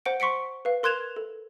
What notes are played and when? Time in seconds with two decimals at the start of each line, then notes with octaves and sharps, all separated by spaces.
0.06 C5 F#5 D7
0.20 C6 C#6 B6 C#7 D7
0.65 B4 F5
0.83 A#4 C6 F#6 G#6 E7 F7
1.16 A4